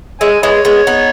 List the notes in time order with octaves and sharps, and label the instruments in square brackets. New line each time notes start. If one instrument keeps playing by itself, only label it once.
[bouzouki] G#3 [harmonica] C#5 E5 G#5
[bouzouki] G#3 B3 [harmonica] E4 G#4 C#5
[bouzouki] G#3 B3 [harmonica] C#5
[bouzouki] B3 D#4